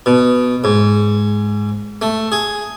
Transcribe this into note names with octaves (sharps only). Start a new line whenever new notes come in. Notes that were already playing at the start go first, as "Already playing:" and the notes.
B2
G#2
A3
G#4